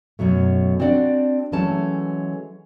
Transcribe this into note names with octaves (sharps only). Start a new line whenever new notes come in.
F#2 B2 F#3 A3
C4 D4 F#4 D5 E5 F#5
E3 F#3 G#3 A3 C#4 A5